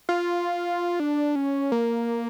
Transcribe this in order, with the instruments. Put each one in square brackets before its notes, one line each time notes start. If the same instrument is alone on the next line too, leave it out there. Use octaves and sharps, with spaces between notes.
[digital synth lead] F4
D4
C#4
A#3